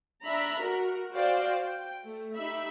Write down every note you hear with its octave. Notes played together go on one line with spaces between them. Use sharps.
D4 E5 A#5 B5
F#4 A#4
F#4 C5 D5 F5 G5
G5
A3
D#4 G4 E5 B5